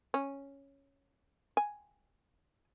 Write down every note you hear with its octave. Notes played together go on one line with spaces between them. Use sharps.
C#4
G#5